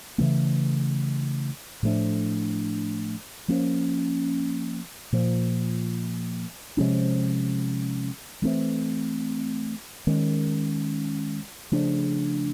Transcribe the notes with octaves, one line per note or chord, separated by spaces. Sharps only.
C#3 E3 A3
A2 F3 A3 D4
F3 A#3 C#4
A#2 F3 A#3
C3 F3 G#3 C#4
E3 A3 C4
D#3 G#3 C#4
C#3 F3 A3 D4